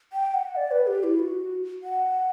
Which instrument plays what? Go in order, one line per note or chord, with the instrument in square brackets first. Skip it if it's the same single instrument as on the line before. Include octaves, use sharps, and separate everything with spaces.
[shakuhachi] G5
F#5
D5
B4
G4
E4
F#4
F#5